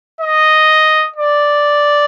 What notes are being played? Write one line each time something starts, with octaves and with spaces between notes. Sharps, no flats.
D#5
D5